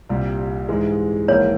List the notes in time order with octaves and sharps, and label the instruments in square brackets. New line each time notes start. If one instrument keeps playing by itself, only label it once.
[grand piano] C2 A#2 G3
G#2 E3 G#3
[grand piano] A#1 G#2 E3 A#3 [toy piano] C#5